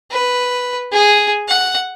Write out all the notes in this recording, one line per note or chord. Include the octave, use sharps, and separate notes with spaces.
B4
G#4
F#5